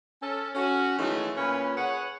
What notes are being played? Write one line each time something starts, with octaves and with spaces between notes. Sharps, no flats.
C#4 A4
C#4 F#4
D#3 E3 F#3 G#3 A3 C#4
A#2 C#4 B4
G#4 B4 C#5 F#5